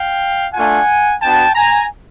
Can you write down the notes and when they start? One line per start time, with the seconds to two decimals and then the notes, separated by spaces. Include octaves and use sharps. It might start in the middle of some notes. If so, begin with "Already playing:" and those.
Already playing: F5 G5
0.54 A3 D4 F4 F#5 G#5
1.21 B3 D4 F#4 G5 A5
1.55 G#5 A#5